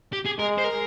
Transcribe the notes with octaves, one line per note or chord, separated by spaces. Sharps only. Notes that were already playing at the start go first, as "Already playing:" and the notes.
G4
G#4
G#3 A#4
C5
A#4